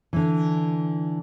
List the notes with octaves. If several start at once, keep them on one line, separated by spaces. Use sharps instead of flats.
D3 E3